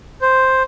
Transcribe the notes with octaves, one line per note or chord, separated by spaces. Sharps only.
C5